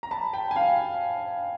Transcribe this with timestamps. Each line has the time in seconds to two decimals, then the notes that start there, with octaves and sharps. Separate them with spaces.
0.03 A#5
0.11 A5 B5
0.33 G5 A5
0.51 G#5
0.56 F5 G5